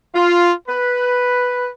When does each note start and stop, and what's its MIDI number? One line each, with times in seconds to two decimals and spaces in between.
0.15 0.51 65
0.68 1.68 71